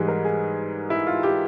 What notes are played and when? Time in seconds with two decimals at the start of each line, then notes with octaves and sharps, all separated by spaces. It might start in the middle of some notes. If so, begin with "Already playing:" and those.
Already playing: G#2 E3 G3 G#4
0.08 A#4
0.25 G#4
0.90 E4
1.07 F4
1.23 G4